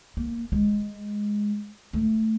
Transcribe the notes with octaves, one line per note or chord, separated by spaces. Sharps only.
A#3
G#3
A3